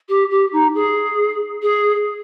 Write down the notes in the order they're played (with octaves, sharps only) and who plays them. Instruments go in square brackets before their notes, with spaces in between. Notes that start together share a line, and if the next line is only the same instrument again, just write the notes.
[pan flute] G4
G4
D#4
G#4
G#4